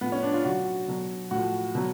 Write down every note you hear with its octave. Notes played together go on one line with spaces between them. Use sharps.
A2 F3 B3
C#4
D4
F4
B2 F#3 F#4
B2 F#3
A2 F3 F#4
B2 F#3